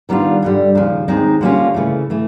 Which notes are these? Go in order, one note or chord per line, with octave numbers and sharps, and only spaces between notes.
D#3 G3 B3 D4 F4
G2 D3 G3
D#2 C#3 F3
D#2 D#3 G#3 C4 D#4
D3 G3 A#3 C#4 F4
C#3 E3 A3
E3 A3